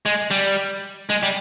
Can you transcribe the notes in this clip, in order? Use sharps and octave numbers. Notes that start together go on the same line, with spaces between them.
G#3
G3
G#3
G3